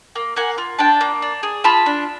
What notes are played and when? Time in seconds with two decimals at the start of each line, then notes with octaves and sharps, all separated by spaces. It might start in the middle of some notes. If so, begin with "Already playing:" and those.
0.15 A#3
0.36 A#3 F#5 G#5
0.58 F4
0.79 D4 G5 A5
1.01 A#3
1.22 D4
1.43 G#4
1.64 F4 A5 B5
1.86 D4